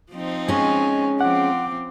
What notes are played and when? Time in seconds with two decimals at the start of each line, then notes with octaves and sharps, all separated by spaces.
0.13 F3 C4 D#4
0.48 G#3 C#4 G#5 C#6
1.21 F3 C4 F#5 D6